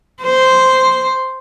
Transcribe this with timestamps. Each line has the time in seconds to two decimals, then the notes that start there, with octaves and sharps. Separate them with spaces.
0.23 C5